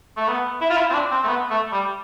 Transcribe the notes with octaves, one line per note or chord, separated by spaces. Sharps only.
A3
B3
E4
F4
E4
C4
D4
C4
A3
B3
A3
G3